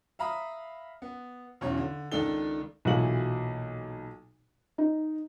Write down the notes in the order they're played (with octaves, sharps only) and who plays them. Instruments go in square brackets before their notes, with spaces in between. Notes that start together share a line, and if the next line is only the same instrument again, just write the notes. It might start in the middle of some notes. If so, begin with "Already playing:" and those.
[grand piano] E5 F5 A#5 B5 D#6
B3
B1 E2 F#3 C#4 C#5
D3
C#2 D#3 D4 A4 G7
[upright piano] B1 A#2 E3 A#3 F#4 F#7
[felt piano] D#4